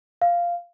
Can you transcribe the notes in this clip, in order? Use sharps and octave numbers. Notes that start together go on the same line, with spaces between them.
F5